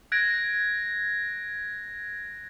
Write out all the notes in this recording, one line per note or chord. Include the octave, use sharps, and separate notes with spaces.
F#6 G#6 A#6 D7